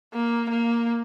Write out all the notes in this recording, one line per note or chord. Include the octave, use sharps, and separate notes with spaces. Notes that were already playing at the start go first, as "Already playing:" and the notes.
A#3
A#3